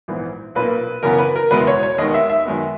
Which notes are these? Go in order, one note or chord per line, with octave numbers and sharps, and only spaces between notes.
A#1 G#2 E3 B3
B1 A#2 A#3 B4
F#2 C#3 E3 B3 A#4
B4
A#4
F#1 E2 B2 G#3 B3 B4
C#5
C#5
D#2 D#3 G#3 B3 D#5
E5
E5
F#2 D#3 G#3 B3